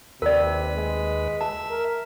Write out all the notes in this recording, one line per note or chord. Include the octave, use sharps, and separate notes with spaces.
D#2 C3 A#4 B4 D5
G#3
E5 A5
A#4